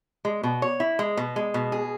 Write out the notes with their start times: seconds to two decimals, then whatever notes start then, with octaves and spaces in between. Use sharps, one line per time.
0.25 G#3
0.43 B2
0.62 C#5
0.80 E4
0.99 G#3
1.17 B2
1.36 G#3
1.54 B2
1.72 G#4